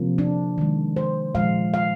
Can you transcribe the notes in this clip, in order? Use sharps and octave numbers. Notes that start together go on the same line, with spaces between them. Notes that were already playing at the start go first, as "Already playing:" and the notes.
Already playing: C3 F3 A#3
D4
D#3 G#3
C5
A#2 F3 G#3 F5
F5